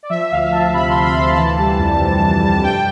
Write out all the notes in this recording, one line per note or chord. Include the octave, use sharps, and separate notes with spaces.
D5
F3 E5
D2 F5
D2 A5
C3 B5
F3 C6
B5
D2
A5
E3 A5
G3
F2
C3
E3
G3
G2 G5